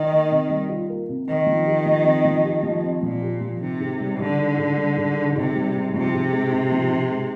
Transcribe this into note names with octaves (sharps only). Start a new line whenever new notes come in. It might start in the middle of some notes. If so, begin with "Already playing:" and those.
Already playing: D#3
A#3
C3
G3
F4
A#3
C3
D#3 C4
F3
G4
F3
C4
F3
G4
F3
C4
A#2 F3
G4
F3
C3 D#3
G#2
G3
G#2 D3
D#3
G#2
G3
G#2
D#3
G#2 C3
G3
G#2
C3 F3
G#2
G#3
G#2
F3
G#2
G#3